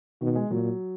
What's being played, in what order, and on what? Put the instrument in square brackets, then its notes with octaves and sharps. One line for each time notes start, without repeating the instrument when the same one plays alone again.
[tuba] B2 [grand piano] D#3
[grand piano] G#3
[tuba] A#2 [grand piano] F#3